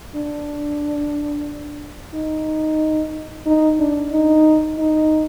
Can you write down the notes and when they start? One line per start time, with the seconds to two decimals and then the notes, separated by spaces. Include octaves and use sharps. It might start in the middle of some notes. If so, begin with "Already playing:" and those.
0.16 D4
2.14 D#4
3.46 D#4
3.80 D4
4.12 D#4
4.78 D#4